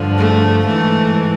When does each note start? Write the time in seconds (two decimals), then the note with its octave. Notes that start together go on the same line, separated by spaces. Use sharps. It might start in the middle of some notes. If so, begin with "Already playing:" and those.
Already playing: G2 D3 F3
0.18 A3
0.67 G#2 E3 A3